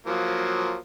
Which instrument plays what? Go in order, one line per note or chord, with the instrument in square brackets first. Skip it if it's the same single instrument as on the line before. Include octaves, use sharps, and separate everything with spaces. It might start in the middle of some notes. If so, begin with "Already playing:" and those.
[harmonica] F3 F#3 A#3